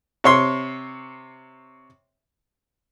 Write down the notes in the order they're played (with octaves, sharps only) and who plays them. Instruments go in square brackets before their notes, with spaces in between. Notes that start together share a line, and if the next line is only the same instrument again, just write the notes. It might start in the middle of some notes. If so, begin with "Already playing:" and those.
[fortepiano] C3 C#5 C6